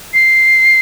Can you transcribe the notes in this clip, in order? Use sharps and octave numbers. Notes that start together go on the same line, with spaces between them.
C7